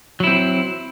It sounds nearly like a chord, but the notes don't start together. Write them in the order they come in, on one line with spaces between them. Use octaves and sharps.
F#3 E4 C4